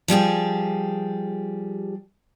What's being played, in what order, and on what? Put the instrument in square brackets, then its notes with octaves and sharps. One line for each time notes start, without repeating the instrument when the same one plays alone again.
[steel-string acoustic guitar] F3 G3 G4 G#4